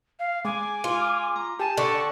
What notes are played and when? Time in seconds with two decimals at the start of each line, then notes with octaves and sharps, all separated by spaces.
0.19 F5
0.45 G#3 G#5 D6
0.84 F4
1.36 A#5
1.60 G4 G#5 A5
1.77 D3 C#6